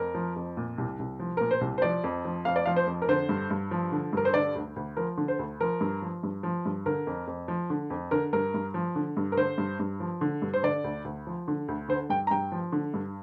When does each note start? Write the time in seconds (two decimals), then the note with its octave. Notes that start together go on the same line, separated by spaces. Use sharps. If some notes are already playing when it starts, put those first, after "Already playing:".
Already playing: F2 A#4
0.15 F3
0.36 F2
0.57 A#2
0.78 C2
0.99 C2
1.19 F3
1.37 A#2 A#4
1.51 C5
1.61 C2
1.78 C5
1.82 F3 D5
2.04 F2
2.25 F3
2.45 F2 F5
2.56 D5
2.66 F3 F5
2.76 C5
2.87 F2
3.02 A#4
3.09 D3 C5
3.29 G2
3.50 G2
3.71 F3
3.92 D3
4.13 G2 A#4
4.25 C5
4.34 D3 D5
4.55 D2
4.76 D2
4.97 F3 A#4
5.17 D3
5.28 C5
5.39 D2
5.60 F3 A#4
5.81 G2
6.02 F3
6.23 G2
6.43 F3
6.65 G2
6.86 D3 A#4
7.07 F2
7.27 F2
7.48 F3
7.70 D3
7.90 F2
8.11 D3 A#4
8.33 G2 A#4
8.54 G2
8.74 F3
8.96 D3
9.17 G2
9.32 A#4
9.37 D3 C5
9.58 G2
9.79 G2
10.00 F3
10.21 D3
10.42 G2
10.54 C5
10.63 D3 D5
10.84 D2
11.05 D2
11.27 F3
11.48 D3
11.68 D2
11.89 D3 C5
12.09 G2 G5
12.27 A#5
12.31 G2 G5
12.52 F3
12.72 D3
12.94 G2